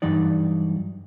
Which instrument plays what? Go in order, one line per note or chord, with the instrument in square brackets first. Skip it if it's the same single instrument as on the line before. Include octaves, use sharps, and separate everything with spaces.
[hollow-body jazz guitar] G2 E3 F#3 D#4 D5